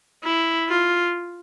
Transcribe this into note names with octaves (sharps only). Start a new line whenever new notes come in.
E4
F4